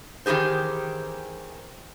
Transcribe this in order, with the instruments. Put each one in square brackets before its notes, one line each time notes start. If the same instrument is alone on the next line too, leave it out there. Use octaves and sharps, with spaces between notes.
[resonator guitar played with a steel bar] D#3 E3 G4 G#4 C5